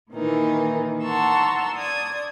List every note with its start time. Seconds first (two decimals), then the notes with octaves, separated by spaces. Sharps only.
0.11 A#2 D#3 E3 D#4
1.04 F#5 A5 A#5 C6 C#6 E6
1.76 D5 D#6 G#6